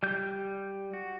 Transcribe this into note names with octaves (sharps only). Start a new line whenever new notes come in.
G3 G6
F#4